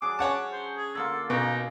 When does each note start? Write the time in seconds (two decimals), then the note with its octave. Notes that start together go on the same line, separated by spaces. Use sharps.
0.02 F#3 D4 G#4 D6
0.19 C#4 C#5 F#5 A5
0.52 C5
0.77 G#4
0.95 D3 A#3 F4 A4
1.30 B2 A#3 C#4 D#4